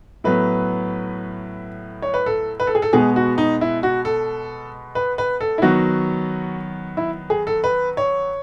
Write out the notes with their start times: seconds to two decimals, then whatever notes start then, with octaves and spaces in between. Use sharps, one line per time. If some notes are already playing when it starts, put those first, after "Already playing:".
0.24 A2 F#3 B3 B4
2.02 C#5
2.14 B4
2.26 A4
2.60 B4
2.67 A4
2.75 G#4
2.82 A4
2.93 B2 G#3 B3 G#4
3.16 F#4
3.38 D#4
3.61 E4
3.83 F#4
4.05 A4
4.95 B4
5.18 B4
5.41 A4
5.58 E4
5.62 D#3 F#3 B3 F#4
6.97 E4
7.30 G#4
7.47 A4
7.64 B4
7.97 C#5